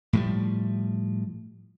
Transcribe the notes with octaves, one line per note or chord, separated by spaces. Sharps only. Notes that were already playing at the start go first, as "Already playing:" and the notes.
A2 F3 G3